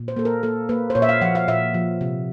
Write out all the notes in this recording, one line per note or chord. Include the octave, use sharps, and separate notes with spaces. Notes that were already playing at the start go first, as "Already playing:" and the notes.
Already playing: A#2
C5
A#3 A4
A#4
A#3 A4
A#3 B4
C5
A#2 C#5
E5
F5
F3 F#5
F5
A#2 E5
F3
C3